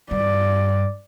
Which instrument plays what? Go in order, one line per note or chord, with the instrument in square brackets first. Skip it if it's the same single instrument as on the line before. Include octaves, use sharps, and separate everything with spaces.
[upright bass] G2 [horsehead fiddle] D5